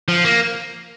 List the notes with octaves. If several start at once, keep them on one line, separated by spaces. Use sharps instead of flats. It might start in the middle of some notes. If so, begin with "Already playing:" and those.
F3
A#3